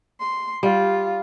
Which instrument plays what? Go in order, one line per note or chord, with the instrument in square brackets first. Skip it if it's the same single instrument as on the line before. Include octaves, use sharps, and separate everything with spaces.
[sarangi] C6
[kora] G3 [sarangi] F4